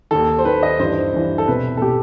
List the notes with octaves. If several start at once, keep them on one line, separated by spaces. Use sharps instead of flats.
D#2 D#3 A4
C5
D#2 D#3 B4
D#5
G2 E3 C5
G2 E3
A4
C2 B2 B4
A4
B2 G4